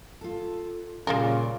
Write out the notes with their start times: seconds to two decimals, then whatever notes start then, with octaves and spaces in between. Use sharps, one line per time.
0.21 F4 A4
1.07 A#2 C#3 G3 A#3 F4 A#4 D5